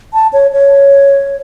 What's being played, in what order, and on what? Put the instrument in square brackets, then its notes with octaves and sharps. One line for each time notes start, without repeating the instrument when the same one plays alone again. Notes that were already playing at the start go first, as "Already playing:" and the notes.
[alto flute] A5
C#5
C#5